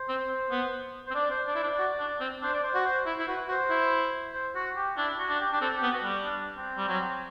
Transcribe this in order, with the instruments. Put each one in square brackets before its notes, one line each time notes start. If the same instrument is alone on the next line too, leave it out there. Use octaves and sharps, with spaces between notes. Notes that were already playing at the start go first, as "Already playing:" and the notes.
Already playing: [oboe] C5
[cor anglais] C4
B3
[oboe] C5
[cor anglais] C4
[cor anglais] D4 [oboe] D5
[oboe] C5
[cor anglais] D4 [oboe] D5
[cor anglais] E4
[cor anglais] D4 [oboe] D5
[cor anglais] F#4
D4
C4
[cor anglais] D4 [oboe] C5
[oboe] D5
C5
[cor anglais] F#4
[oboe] C5
[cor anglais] E4
E4
[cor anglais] F#4 [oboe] B4
[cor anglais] F#4 [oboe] C5
[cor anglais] E4
[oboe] C5
F#4
G4
[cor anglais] D4 [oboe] E4
[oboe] F#4
[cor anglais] D4
[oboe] G4
[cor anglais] D4 [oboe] G4
[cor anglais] C4 [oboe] A4
[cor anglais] B3 [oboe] G4
[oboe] F#4
[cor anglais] G3
[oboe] D4
C4
[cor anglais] G3
F#3